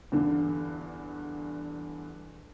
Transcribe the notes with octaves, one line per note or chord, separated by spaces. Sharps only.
E2 G2 D3